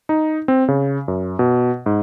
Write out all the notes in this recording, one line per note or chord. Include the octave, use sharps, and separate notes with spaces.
D#4
C4
C#3
F#2
B2
G#2